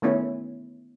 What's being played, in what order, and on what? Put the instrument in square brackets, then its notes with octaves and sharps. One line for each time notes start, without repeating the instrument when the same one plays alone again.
[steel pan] D#3 A3 B3 C#4 E4 C#5